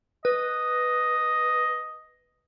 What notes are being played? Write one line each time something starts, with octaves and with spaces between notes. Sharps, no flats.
B4 D#5